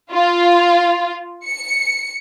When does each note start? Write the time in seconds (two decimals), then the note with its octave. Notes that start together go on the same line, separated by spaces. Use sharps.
0.12 F4
1.47 C#7